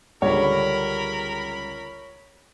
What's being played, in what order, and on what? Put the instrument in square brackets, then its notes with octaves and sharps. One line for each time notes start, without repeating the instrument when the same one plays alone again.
[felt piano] C#2 D3 G3 [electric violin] A#4 B5 [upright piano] C#5